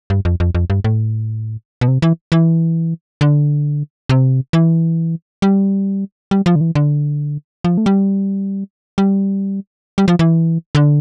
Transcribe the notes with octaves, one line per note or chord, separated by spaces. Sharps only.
G2
F2
F2
F2
G2
A2
B2
C3
E3
E3
D3
C3
E3
G3
G3
F3
D3
E3
D3
F3
A3
G3
G3
G3
F3
E3
D3